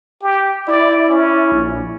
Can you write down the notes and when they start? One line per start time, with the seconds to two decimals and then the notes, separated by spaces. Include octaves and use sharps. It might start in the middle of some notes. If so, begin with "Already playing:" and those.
0.22 G4
0.68 E4 D5
1.10 C#4
1.52 A#1